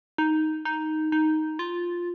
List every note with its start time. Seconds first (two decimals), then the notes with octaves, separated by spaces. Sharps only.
0.18 D#4
0.65 D#4
1.12 D#4
1.59 F4